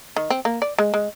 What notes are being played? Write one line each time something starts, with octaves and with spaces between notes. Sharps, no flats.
D#3
C4
A#3
D5
G#3
G#3